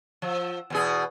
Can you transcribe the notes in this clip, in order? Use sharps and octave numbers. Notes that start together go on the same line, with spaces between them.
F3
E2 B2 G#4